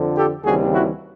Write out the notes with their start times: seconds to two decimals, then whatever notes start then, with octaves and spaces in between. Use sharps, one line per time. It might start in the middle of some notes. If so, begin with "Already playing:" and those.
Already playing: F2 D3 F3
0.17 G4 A4
0.44 D#2 C#3 E3 G3 C4 F#4 G#4
0.73 E4 F#4